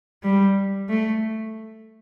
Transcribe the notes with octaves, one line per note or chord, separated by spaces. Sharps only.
G3
A3